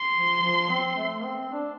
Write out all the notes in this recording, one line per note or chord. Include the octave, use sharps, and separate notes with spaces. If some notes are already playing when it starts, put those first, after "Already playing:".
Already playing: C6
F3
F3
C4
A3
C4
D4